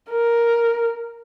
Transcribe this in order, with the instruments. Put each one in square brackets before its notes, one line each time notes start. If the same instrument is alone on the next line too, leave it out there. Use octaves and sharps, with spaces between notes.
[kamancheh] A#4